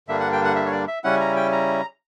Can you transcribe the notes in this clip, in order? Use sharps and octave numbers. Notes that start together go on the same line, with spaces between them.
G2 D3 G3 A#3 D4 E5
F#5
G5
F#5
E5
C#5
D5
E5
C#3 G3 C#4 E4 F#5
A#5
G5
A#5